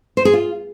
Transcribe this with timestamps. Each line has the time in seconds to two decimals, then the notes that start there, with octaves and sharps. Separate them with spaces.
0.17 C5
0.25 G#4
0.33 F4